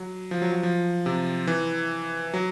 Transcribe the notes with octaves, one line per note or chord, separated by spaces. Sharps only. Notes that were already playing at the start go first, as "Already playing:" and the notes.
Already playing: F#3
F3
F#3
F#3
F3
C3
E3
F#3